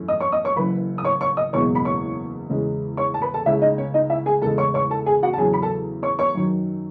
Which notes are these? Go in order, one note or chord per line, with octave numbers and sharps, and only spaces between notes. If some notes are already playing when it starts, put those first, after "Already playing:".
Already playing: F#2 E3 A3 C#4
D#5 D#6
C#5 C#6
D#5 D#6
C#5 C#6
F#1 F#2 E3 B4 B5
D#6
C#5 C#6
C#5 C#6
D#5 D#6
F#1 E2 B2 G#3 B3 C#5 C#6
B5
C#5 C#6
E2 C#3 G#3 C#4
C#5 C#6
A5
B4 B5
A4 A5
C#2 C#3 G#3 C#4 E4 E5
D#4 D#5
C#4 C#5
D#4 D#5
E4 E5
G#4 G#5
E2 C#3 G#3 A4 A5
C#5 C#6
C#5 C#6
A4 A5
G#4 G#5
F#4 F#5
A5
E2 C#3 F#3 C#4 G#4 G#5
B5
A4 A5
C#5 C#6
C#5 C#6
F#2 D#3 F#3 C#4